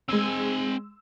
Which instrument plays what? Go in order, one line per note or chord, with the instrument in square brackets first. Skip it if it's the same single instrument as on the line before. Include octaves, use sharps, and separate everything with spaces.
[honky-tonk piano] G#3 E6 [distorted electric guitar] C4 G#5